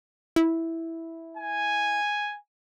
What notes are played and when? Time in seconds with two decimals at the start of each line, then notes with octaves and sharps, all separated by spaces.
0.36 E4
1.37 G#5